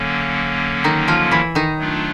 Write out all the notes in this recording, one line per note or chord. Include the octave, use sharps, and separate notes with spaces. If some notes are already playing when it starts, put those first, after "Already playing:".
Already playing: D3 F#3 A#3 C#4
D#3 D#4
F3 F4
E3 E4
D#3 D#4
F#3 A3 D4 F4